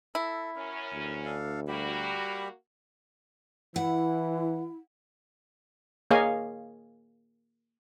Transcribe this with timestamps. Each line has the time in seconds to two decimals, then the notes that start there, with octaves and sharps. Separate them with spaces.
0.15 E4 A4
0.56 F#2 C#4 A#4
0.93 D2
1.25 D4 A4 F5
1.68 G3 A#3 F#4 G4 B5
3.76 E3 E4 F#5
6.11 A#3 G#4 C#5 D#5 F5 G#5